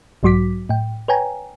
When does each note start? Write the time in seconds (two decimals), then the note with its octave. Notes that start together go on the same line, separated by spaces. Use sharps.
0.23 B1 G#2 F#3 F#4 D6 B6
0.69 A2 G5
1.08 B4 C#5 G5 G#5 A#5